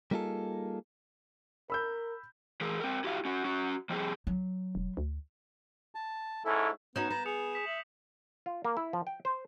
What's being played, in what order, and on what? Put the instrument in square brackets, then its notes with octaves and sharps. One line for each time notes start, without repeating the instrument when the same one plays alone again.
[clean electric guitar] G3 A#3 D#4 F4 G#4 A4
[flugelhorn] A#4 [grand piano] B5 E6 G6
[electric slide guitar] E3 G#4 A#4
C4 A#4
E4 F#4 G4 E5 F5
C#4 F#4
C#4 F#4
F3 G3 C4 G#4
[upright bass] F#3
[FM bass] E1
D2
[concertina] A5
[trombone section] G#2 C#4 E4 [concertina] A4
[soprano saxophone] B3 [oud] C#4 D#4 F#4 [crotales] G6 E7
[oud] B3 [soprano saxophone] A#5
[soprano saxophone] G#4 [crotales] D#6 C#7 F7
[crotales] D#6 B6 E7
[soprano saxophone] E5 [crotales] F#7
[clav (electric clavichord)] F4
A#3
E4
F3
G5
C5